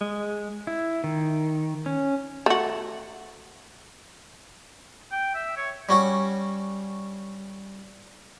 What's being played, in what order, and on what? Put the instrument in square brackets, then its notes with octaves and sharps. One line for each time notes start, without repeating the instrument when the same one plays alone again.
[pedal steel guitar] G#3
E4
D#3
C#4
[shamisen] A3 F#4
[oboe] G5
E5
C#5
[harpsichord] G3 C#4 F#4 C#5